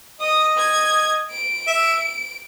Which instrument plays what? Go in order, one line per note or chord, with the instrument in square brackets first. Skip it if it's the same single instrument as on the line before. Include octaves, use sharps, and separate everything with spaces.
[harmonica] D#5 [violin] D#6
[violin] G#6
D7
[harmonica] E5